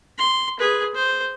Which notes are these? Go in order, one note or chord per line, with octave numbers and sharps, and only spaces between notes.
C6
G#4 B4
C5